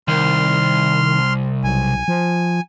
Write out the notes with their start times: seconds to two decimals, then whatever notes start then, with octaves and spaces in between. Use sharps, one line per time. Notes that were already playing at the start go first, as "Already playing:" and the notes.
0.08 C2 D#3 C6 F6
1.64 B1 G#5
2.08 F3